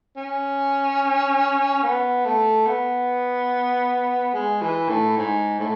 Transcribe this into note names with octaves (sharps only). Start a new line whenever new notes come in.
C#4
B3
A3
B3
G#3
E3
A2
G#2
A2